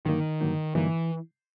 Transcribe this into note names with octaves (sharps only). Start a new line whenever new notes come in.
G2 D3 D#3 F#3 A#3 D#4
G2 D3 F#3 A#3 D#4
G2 D3 E3 F#3 A#3 D#4